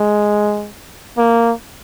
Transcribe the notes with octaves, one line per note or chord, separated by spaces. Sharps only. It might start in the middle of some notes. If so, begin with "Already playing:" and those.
Already playing: G#3
A#3